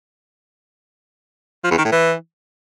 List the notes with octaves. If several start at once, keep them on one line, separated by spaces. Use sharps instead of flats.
F3
E2
D#3
A2
E3